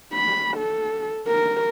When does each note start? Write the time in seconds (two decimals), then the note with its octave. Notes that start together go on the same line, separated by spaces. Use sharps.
0.13 B5
0.56 A4
1.27 A#4